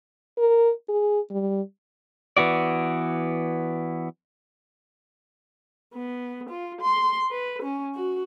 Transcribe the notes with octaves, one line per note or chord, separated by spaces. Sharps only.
A#4
G#4
G3
E3 B3 F#4 D5
B3
F4
C6
B4
C#4
F#4